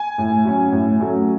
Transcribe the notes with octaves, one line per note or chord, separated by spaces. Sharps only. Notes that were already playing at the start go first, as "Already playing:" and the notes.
Already playing: G#5
A2
F#3 C#4
A2
F#3 A3 C#4